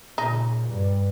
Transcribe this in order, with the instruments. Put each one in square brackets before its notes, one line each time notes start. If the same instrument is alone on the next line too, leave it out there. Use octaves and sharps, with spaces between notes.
[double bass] A#2 C#3 [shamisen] D#4
[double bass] G2